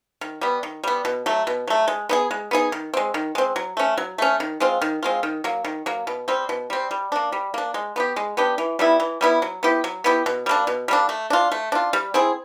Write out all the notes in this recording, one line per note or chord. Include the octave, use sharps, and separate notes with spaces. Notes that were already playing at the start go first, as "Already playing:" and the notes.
D#3
G3 B3
D#3
G3 B3
B2
F#3 A3
B2
F#3 A3
G#3
B3 D#4 G#4
G#3
B3 D#4 G#4
D#3
G#3 C4
D#3
G#3 C4
F#3
A3 C#4
F#3
A3 C#4
D#3
G#3 C4 F4
D#3
G#3 C4 F4
D#3
F#3 A#3
D#3
F#3 A#3
B2
G3 C4
B2
G3 C4
G3
A#3 D4
G3
A#3 D4
G#3
B3 D4 G4
G#3
B3 D4 G4
E3
G3 B3 E4
E3
G3 B3 E4
F#3
B3 E4 G4
F#3
B3 E4 G4
B2
G3 A#3 D4
B2
G3 A#3 D4
A3
D4 F4
A3
D4 F4
G3
C4 E4 G#4